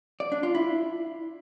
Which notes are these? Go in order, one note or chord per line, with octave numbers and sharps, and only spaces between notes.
D5
D4
F4
E4